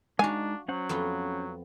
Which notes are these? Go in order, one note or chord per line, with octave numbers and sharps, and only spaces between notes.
G#3 D4 D#4 F#4 F5 G#5
F#3 C#4 C5 F#5
F2 B3 F4